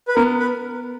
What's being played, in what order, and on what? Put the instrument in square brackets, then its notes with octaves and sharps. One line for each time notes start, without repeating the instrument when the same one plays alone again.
[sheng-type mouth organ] B4
[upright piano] B3 [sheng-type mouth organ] A#4
[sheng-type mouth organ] B4